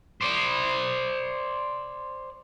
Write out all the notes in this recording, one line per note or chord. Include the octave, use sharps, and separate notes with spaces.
C5 D5